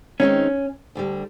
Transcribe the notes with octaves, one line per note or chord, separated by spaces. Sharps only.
D#3 G#3 C4 C#4 D#4
D2 D3 G3